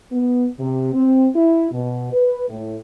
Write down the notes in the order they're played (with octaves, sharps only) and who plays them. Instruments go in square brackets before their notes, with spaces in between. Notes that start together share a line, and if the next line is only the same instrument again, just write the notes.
[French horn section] B3
C3
C4
E4
B2
B4
A2